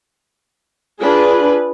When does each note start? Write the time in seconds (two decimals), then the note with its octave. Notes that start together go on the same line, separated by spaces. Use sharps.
1.00 D4 F4 G#4 B4